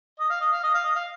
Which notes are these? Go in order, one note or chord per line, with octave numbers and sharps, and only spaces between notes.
D#5
F5
D#5
F5
D#5
F5
D#5
F5